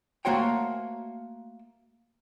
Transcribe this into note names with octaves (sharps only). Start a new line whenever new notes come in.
A3 A#3 F#4 C5 C#5 G5